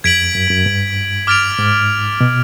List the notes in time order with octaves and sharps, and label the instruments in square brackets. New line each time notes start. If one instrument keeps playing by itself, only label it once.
[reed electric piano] F2 [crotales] G#6 B6 D7 F#7
[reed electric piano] F#2
F#2
G2
[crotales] D6 F6 A6 D7 F7
[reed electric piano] G#2
B2